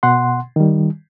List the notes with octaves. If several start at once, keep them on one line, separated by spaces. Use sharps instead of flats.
B2 F#5 C6
D#3 G3